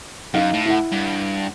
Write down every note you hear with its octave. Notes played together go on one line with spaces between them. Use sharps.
F#2 D#4 F5
A2
E4 F#5
G2